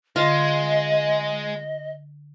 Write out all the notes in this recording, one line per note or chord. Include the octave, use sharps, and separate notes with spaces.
D3 G#3 F4 D#5